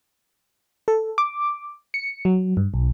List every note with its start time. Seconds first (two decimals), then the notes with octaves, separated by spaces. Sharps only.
0.88 A4
1.18 D6
1.94 C#7
2.25 F#3
2.57 G2
2.74 B1